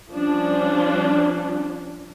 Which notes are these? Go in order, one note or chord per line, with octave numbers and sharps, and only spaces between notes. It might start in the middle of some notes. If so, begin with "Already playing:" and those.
F3 G3 C#4 D4